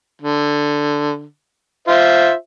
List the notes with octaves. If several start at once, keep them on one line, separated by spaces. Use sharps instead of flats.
D3
F4 C5 E5